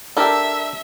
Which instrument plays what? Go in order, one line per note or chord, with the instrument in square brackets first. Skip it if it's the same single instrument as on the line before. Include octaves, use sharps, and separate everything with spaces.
[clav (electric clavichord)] D4 G4 [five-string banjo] A4 A#4 [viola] E5